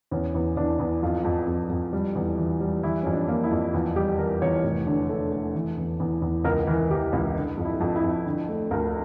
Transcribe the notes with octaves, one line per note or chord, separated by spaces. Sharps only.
E2 C#4
E2
E2 D4
E2
F2 F4
F2
F2
F2
G3
E2
E3
G3
E3 E4
F2 C#4
D4
A#3
E4
F2
E2 F4
G3 G4
E3 A#4
E2 C#5
F1
D3
A3
A3
E3
E2
E2
E2
C#2 A#4
E3 A#4
E3 G4
C#2 E4
D3
F2
E4
F2
E4
F2
D3
A3
D2 A#4